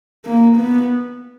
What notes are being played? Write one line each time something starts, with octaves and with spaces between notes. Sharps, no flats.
A#3
B3